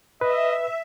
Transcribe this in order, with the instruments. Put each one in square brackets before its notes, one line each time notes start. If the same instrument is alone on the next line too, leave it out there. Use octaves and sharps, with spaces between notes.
[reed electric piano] B4 [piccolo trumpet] D#5 [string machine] E5